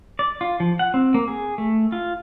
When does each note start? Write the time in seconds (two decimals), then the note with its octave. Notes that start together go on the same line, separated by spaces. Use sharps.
0.19 D5
0.41 F4
0.60 F3
0.79 F#5
0.94 C4
1.14 A#3
1.28 G#4
1.58 A3
1.92 F4